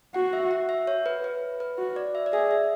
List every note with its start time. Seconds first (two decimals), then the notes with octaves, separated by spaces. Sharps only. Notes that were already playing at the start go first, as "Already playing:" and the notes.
0.14 F#4 F#5
0.33 E5
0.51 F#5
0.69 E5
0.87 C#5
1.06 B4
1.24 B4
1.60 B4
1.78 F#4
1.96 D5
2.15 E5
2.26 D5
2.32 G#4 E5
2.51 E5